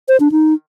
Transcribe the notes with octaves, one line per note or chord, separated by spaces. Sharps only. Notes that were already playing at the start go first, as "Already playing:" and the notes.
C5
D4
D#4